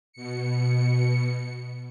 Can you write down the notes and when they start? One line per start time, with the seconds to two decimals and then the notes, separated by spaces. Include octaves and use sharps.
0.13 B2 C#7